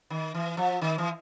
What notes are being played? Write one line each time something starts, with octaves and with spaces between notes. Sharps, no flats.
D#3
E3
F3
D#3
E3